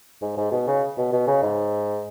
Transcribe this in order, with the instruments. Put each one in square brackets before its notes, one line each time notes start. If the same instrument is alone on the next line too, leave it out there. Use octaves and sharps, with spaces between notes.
[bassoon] G#2
G#2
B2
C#3
B2
B2
C#3
G#2